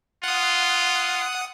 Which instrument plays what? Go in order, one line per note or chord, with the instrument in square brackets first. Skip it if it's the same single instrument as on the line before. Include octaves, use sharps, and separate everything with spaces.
[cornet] F4 [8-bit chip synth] F#5 D#6